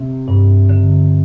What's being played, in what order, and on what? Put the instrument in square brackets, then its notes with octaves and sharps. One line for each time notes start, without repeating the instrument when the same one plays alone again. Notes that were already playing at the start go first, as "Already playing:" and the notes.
Already playing: [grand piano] C3
[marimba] G2
D3